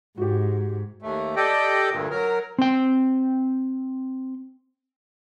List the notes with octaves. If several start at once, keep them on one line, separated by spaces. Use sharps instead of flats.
G#2 F#4 G4
D#2 A3
G4 A4 D5 D#5 G5
D2 G2 A#2
F#3 A#4
C4 G5